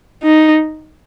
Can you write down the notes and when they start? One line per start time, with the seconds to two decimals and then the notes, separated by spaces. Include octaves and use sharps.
0.23 D#4